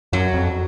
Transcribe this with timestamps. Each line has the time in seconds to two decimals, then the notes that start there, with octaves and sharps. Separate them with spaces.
0.13 F#2 F#3
0.34 F2